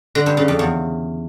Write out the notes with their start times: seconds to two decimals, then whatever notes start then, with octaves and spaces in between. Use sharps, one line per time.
0.15 D3
0.26 G2
0.37 C#3
0.48 F2
0.59 E2